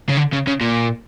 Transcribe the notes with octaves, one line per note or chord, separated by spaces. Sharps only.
C#3
D3
C#3
C#3
A#2